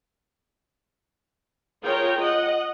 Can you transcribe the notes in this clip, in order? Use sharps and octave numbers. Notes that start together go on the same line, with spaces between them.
F4 G#4 A#4 C#5 G5
D#5 F#5